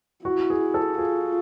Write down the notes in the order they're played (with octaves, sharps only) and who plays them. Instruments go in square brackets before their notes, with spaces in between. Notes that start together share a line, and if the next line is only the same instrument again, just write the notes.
[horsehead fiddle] E4 [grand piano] F#4
[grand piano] G#4
A4
[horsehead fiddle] F4 [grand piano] G#4